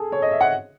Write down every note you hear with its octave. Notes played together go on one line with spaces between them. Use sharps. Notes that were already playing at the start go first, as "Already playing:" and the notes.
Already playing: G#4 A4
C#5
D#5
E5
F#5